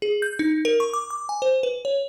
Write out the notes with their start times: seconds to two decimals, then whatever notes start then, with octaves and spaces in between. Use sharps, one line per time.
0.02 G#4
0.22 G6
0.39 D#4
0.65 A#4
0.80 C#6
0.93 D6
1.10 D6
1.29 G#5
1.42 C5
1.63 B4
1.85 C#5